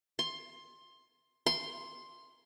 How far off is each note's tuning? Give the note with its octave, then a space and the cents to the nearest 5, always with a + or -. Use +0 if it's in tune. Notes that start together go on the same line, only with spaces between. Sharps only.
C6 +15
C6 +5